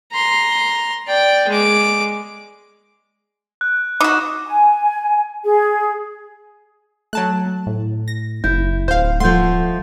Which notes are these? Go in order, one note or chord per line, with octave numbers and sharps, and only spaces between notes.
A#5 C6
D5 G5
G#3 D6
F#6
D#4 F#4 D6
G#5
G#4
F#3 A3 A5 F#6
A2
A#6
F#1 E4 G6
D1 C5 F5 G6
F3 A3 F#5 C6 G6